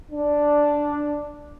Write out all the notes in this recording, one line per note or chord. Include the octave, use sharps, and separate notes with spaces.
D4